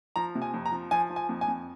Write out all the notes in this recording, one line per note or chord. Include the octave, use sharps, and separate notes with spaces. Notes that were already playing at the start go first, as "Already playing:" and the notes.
F3 A#5
C3
G#5
F2
A#5
F3
F3 G#5
F3
G#5
F2
G#5
F2